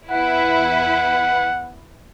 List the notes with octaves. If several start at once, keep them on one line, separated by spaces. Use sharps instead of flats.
E2 E4 B4 F#5